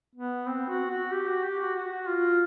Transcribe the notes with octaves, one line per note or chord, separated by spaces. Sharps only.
B3
C4
F#4
F#4
G4
F#4
G4
F#4
F#4
F4